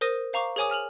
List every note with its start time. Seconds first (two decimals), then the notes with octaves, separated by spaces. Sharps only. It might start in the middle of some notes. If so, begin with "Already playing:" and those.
0.01 A#4 C5 D#6 A#6 D#7
0.33 C5 F5 A#5 C#6 D6
0.56 G#4 A#4 C#5 G#5 D6 D#6
0.70 G#5 F6 F7 F#7